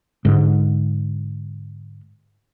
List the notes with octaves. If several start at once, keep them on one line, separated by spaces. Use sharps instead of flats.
G#2 D3